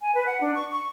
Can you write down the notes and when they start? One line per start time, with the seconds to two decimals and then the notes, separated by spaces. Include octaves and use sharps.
0.01 G#5
0.15 B4
0.26 F#5
0.41 D4
0.55 C#6
0.71 C#6